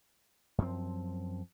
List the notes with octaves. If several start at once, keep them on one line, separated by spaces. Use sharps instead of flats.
F#2 F3 C4